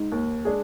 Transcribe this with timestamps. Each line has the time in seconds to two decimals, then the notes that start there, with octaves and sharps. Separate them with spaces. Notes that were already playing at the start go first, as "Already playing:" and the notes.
Already playing: G#2
0.12 D#2
0.45 G#3 D4 G#4